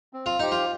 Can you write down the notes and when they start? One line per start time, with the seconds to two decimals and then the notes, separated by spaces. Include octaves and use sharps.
0.13 C4
0.26 F4
0.39 D#4 G4 C5 G5
0.51 F4